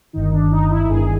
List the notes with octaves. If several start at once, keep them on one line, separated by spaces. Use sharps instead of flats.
G1 G2 D#3 D#4
D4
D#4
E4
G1 G2 D#3 G#4